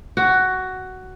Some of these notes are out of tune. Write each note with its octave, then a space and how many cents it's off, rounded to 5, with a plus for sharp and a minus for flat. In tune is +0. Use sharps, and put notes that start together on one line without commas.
F#4 +10